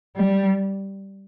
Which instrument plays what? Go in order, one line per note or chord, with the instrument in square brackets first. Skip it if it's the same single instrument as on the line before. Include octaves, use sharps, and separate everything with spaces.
[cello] G3